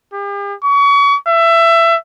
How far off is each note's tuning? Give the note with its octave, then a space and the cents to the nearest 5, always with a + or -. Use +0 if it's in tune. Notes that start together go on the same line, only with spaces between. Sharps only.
G4 +45
C#6 +35
E5 +20